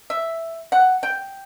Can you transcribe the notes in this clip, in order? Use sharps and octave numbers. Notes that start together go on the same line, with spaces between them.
E5
F#5
G5